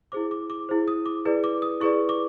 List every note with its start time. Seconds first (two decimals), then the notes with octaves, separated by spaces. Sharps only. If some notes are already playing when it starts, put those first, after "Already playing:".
0.12 E4 G#4 C5 D6
0.31 D6
0.50 D6
0.69 E4 G#4 C5
0.88 D#6
1.06 D6
1.25 E4 G#4 B4 D5
1.44 D6
1.62 D#6
1.80 E4 G#4 B4 D5 C#6
2.09 D6